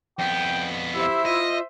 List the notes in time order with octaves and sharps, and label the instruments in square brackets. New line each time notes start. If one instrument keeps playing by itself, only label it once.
[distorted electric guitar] F2 B3 [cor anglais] G5
[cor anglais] E4 [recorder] G4 [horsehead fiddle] C5 E5
[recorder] F4 [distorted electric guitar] D#5